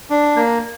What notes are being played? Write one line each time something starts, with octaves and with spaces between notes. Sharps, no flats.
D4
A#3